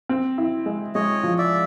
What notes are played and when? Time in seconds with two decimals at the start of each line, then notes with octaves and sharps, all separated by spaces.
0.09 C4
0.38 E4
0.66 G#3
0.95 G#3 C#5 D#5
1.23 F3
1.38 D5 E5